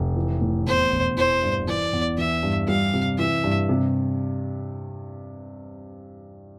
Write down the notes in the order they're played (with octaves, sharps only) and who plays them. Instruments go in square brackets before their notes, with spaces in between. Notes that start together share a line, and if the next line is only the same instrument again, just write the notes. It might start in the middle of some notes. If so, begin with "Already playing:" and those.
Already playing: [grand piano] F1
E3
A2
[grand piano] E2 [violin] C5
[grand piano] E1
[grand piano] E3 [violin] C5
[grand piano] G2
[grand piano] E3 [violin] D5
[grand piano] E2
[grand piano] E3 [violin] E5
[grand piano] G2
[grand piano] G3 [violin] F5
[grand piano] C3
[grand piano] E3 [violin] E5
[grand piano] G2
C3